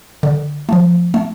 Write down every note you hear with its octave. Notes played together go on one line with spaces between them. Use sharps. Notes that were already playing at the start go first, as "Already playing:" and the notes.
D3
F3 A3
A3